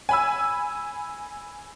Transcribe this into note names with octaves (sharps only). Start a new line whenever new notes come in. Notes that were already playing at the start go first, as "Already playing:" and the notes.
G#5 B5 E6